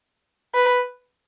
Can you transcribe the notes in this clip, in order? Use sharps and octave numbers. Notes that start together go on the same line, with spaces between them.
B4